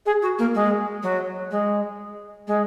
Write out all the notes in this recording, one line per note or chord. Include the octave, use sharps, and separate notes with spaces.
G#4
F#4
A#3
G#3
F#3
G#3
G#3